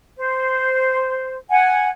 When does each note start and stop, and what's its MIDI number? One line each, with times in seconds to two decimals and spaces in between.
0.18 1.35 72
1.50 1.88 78
1.50 1.88 80